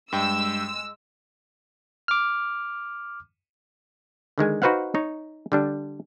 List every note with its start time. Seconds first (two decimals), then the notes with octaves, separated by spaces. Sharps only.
0.13 G2 G#3 G5 E6
2.08 D6 F6
4.38 D3 D#3 G#3 G#5
4.62 D#4 F#4 B4 C5 F5 F#5
4.95 D#4 C#5
5.52 D3 G3 D4